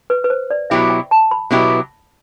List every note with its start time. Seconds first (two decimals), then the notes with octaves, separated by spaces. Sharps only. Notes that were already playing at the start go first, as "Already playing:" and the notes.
0.10 B4
0.24 B4
0.30 C5
0.50 D5
0.70 B2 F#3 B3 E4 G4 E5
0.90 G5
1.11 A5
1.31 B5
1.51 B2 F#3 B3 E4 G4